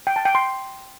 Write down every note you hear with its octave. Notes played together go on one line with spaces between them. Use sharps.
G5
A5
G5
C6